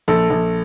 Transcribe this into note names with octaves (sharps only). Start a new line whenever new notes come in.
A#1 A4
A#1